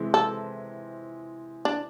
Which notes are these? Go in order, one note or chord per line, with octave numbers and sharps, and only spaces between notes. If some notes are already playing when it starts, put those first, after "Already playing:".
Already playing: C3 E3 G#3 C4
A4
D4